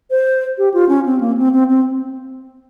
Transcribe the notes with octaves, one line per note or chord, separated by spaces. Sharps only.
C5
G4
F4
C#4
C4
A#3
C4
C4
C4